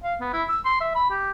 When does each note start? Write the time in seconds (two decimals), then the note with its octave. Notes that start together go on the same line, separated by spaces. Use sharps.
0.04 F5
0.20 B3
0.33 E4
0.49 E6
0.65 C6
0.80 E5
0.95 B5
1.10 G4